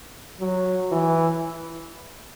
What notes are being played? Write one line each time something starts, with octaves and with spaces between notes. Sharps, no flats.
F#3
E3